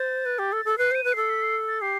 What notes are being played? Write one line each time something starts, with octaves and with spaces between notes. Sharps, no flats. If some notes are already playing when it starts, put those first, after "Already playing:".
Already playing: C5 A6
B4
G4
A4
A4
B4 C7
C5 D#7
B4
A4 C7
B6
C7
A6
G4 C7